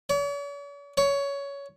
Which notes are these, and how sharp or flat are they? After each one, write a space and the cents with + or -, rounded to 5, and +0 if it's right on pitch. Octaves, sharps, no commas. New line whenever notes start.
C#5 +45
C#5 +15